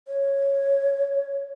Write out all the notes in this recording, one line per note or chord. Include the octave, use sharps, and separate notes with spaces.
C#5